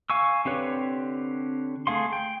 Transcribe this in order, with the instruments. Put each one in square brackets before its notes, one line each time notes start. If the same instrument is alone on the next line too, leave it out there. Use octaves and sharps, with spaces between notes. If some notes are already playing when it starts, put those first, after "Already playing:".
[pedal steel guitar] F5 G#5 C#6 E6
D3 C4 G4 B4 C#5
A3 G#4 F5 C6
G5